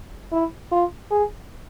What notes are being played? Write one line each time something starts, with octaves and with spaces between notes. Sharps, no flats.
E4
F4
G#4